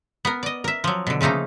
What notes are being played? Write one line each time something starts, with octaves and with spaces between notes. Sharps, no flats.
B3 A#4
D5 D#5
A#4 E5
F3 F#3
B2 D3
C#3 F3 A3 A#3 D#4